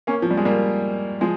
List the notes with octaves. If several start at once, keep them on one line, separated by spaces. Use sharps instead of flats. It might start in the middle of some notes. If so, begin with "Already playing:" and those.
A#3 C#4
F3
G3
G#3
G3 A#3
F3 G#3